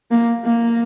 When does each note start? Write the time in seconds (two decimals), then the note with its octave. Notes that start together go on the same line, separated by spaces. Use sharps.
0.11 A#3
0.45 A#3